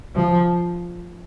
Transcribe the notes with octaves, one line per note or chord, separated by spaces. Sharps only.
F3